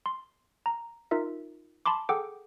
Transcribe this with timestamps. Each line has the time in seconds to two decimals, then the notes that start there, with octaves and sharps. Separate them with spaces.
0.06 C6
0.66 A#5
1.11 D#4 F4 A#4 E5
1.86 A5 B5 C6 D6
2.09 G#4 A4 F#5 G5 D6